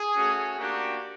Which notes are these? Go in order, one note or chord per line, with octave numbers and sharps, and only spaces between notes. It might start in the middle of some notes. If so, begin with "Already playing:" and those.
Already playing: G#4
A3 C#4 F#4
A#3 D4 F#4 G4